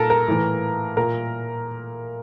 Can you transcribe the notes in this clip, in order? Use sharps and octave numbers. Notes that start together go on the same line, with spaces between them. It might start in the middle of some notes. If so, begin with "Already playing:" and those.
Already playing: A#2 A4 A#4
A#4
A2 E3
A#2 A#4